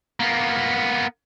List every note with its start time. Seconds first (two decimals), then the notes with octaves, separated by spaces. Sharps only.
0.20 A#3 B3